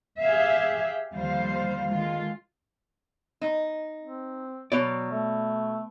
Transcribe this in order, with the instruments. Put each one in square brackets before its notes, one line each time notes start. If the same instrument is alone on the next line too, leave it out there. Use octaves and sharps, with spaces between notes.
[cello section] G4 G#4 E5 F5
D#2 D3 F3 G3 C5 F5
D3 D#3 G#3 F4
[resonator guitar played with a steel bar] D#4
[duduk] C4
[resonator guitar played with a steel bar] B2 [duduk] F#3 [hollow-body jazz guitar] C#5 D5
[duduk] A3